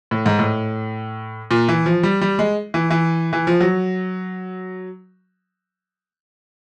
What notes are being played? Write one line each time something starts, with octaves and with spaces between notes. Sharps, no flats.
A2
G#2
A2
A#2
E3
F3
G3
G3
G#3
E3
E3
E3
F3
F#3